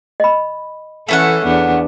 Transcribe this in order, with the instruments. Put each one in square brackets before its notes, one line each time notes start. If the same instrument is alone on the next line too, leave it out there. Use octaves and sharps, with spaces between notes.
[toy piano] D#5 B5
[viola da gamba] E3 A4 [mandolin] A3 C#4 F#5
[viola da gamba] E2 B3 D4